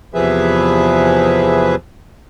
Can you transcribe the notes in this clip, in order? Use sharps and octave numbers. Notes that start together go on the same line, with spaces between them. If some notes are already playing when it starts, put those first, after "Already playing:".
E2 C3 F3 G#4 B4 E5